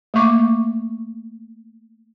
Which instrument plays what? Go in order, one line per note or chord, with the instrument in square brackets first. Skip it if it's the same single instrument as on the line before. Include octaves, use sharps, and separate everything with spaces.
[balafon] A3 A#3 C#6 D6